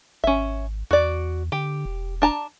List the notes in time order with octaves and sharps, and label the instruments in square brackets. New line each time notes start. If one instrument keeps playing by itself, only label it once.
[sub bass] G#1 [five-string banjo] C#4 E5
[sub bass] E2 [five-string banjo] F#4 D5
[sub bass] D3 [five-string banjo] G4
[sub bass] E1
[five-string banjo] D4 A5 A#5